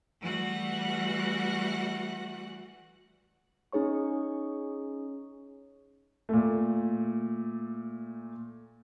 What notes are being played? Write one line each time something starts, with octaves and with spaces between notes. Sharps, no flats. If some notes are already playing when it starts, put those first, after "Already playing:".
E3 G3 A3 F#4 F#5 F#6
C#4 D#4 G#4 C#5 C#6
A#2 A3